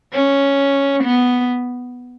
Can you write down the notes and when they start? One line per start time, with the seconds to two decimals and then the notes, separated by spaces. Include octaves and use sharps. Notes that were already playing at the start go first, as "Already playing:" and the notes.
0.13 C#4
1.04 B3